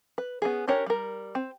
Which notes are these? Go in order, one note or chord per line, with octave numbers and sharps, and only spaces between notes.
B4
B3 C#4 G#4
C#4 D4 G4 A#4 C#5
G3 A#4
C4